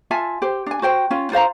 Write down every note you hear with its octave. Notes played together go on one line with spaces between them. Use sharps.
F4 E5 G#5 A5
G4 C5
D4 G#5
F#4 C5 G5
C#4 F4
F4 C5 F5 A#5